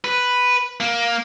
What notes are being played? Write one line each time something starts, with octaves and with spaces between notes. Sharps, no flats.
B4
A#3